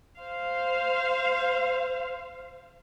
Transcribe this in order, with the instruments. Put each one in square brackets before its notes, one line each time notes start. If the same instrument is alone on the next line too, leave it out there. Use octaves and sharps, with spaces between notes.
[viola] C5 F5